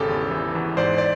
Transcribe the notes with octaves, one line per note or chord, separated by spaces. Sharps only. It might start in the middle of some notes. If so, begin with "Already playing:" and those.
Already playing: G#1 C#3 G4 A4
E2
E3
E2
G#2 C5 D5
D5